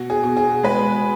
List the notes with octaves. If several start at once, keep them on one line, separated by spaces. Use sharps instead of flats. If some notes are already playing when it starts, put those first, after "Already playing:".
Already playing: B2 F#4
G#4
B2
G#4
G#3 B4